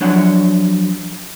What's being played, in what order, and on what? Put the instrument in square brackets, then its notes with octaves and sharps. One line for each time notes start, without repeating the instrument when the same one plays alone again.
[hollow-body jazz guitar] F3 F#3 D4 C#5 F#5